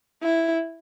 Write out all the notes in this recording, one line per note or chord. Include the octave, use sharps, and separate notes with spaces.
E4